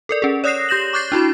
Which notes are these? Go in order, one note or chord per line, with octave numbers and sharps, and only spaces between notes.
A4 A#4 D5
C#4 G#4
C#5 D5 D#6 F#6 A#6 C7
G4 G6 A#6 E7 F#7
C#6 D6 F#6 G6 A6 C7
D4 E4 F#4 B5